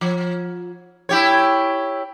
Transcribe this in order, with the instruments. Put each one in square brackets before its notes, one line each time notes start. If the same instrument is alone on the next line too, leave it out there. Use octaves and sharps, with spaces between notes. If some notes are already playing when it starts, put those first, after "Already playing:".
[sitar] F3
E4 G4 C#5